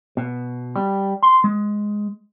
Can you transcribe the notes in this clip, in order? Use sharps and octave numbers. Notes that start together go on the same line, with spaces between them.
B2
G3
C6
G#3